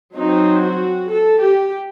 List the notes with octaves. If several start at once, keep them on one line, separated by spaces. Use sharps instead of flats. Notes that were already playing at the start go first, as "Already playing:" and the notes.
F#3 C4 D#4
F#4
A4
G4